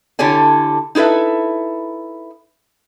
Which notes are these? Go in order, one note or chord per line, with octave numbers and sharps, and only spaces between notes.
D3 E4 G4 A4 C#5 G#5
D#4 E4 A4 B4 E5